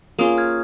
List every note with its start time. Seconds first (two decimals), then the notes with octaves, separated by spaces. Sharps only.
0.19 A#3 C#4 F4 G#4 D#6
0.38 F6 G#6